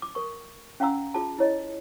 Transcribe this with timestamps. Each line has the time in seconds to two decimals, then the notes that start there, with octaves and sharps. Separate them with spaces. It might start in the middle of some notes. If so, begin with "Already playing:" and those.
0.02 D6
0.15 A#4 C#6
0.80 C#4 F5 F#5 A#5 E6
1.14 F4 G#4 A5
1.38 E4 C#5 D#5